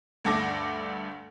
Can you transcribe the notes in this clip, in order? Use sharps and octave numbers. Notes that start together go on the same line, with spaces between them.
D2 G2 A3 A4 D6 A#6